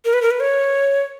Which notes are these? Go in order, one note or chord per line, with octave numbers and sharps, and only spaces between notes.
A#4
B4
A#4
B4
C#5